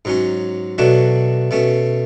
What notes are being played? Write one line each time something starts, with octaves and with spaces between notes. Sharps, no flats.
G#2 F#3 C#4
B2 F#3 A3 D4 F#4
B2 A3 C#4